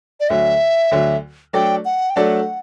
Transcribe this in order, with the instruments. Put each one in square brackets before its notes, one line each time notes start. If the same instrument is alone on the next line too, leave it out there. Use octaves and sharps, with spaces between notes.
[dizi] D5
[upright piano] D2 D3 F#3 [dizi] E5
[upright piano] D2 D3 F#3
[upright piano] F#3 A3 D4 A4 D5 [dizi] G5
[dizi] F#5
G5
[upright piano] F#3 A3 D4 A4 D5 [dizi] F#5